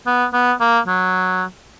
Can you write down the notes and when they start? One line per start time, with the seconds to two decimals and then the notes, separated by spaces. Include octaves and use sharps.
0.06 B3
0.33 B3
0.60 A#3
0.87 F#3